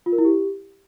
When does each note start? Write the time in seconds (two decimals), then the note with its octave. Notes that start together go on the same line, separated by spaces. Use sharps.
0.06 F4
0.12 A#4
0.18 E4
0.25 G4